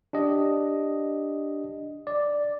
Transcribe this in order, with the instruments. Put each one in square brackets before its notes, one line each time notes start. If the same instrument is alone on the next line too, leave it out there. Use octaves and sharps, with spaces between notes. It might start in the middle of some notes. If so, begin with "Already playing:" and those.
[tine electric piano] D4 G4 D#5
D5